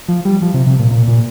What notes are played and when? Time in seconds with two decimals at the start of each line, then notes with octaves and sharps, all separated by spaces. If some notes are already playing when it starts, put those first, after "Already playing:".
0.08 F3
0.25 G3
0.42 F3
0.54 C3
0.67 C3
0.79 A#2
0.91 A#2
1.08 A#2